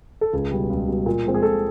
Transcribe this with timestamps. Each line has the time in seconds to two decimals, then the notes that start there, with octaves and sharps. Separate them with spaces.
0.21 A4
0.33 C#2 G#4
0.52 B2 G3
0.70 C#2
0.88 B2 G3
1.06 A#2
1.25 F3 G#3 C4
1.34 G#4
1.42 A#2 A4